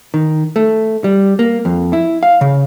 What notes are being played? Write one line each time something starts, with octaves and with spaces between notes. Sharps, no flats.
D#3
A3
G3
A#3
F2
E4
F5
C#3